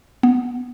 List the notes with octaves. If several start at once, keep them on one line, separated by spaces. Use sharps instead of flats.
B3